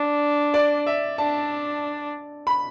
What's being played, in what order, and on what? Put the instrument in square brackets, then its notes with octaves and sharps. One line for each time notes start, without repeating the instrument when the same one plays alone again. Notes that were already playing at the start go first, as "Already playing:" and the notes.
Already playing: [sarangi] D4
[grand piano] D5
E5
[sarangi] D4 [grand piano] A5
[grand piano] B5